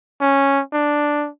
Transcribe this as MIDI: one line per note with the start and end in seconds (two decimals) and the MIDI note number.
0.21 0.61 61
0.73 1.29 62